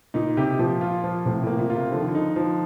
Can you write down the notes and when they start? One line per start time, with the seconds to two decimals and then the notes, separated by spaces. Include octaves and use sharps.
0.14 A#2 D#4
0.37 C3 G4
0.59 A#2 F3
0.81 F4
1.04 F3
1.25 A2 C3
1.42 A2 A#3
1.59 A#2
1.70 F4
1.76 C3
1.91 D3 F3
2.00 D#3
2.08 D3
2.15 D#4
2.36 F3